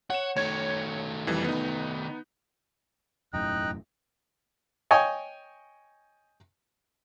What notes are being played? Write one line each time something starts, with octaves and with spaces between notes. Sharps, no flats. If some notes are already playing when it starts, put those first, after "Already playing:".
C#5 F#5 E7
D#3 A3 C#5 G#6
F2 E3 G3
B3 D#4
E1 F#2 A2 D#4 D#5 G5 F#6
C#5 D#5 G5 G#5